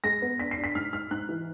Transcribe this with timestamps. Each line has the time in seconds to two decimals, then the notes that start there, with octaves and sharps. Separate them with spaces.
0.04 G#3 A#6
0.22 B3
0.39 D4 B6
0.51 C7
0.57 D4
0.64 B6
0.75 G#2 F6
0.93 G#2 F6
1.11 G#2 F#6
1.29 E3